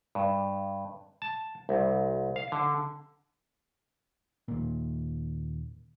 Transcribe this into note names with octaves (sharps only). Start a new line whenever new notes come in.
G2
A5
C2
F5
D3
D#2 A#2